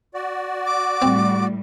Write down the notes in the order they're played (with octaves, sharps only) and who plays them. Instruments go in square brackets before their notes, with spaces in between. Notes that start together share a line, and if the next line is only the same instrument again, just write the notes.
[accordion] F#4 D5
[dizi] D6
[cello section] A2 G3 [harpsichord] C4